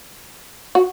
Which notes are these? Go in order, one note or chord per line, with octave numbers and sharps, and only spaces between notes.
F#4